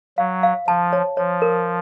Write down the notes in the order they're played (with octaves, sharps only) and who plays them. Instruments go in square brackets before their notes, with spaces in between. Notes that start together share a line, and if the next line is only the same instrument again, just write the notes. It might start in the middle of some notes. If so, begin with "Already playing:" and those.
[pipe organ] F#3 [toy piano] F5
[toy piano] F5
[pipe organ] F3 [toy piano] A5
[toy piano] C#5
[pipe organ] F3 [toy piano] C#5
[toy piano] A#4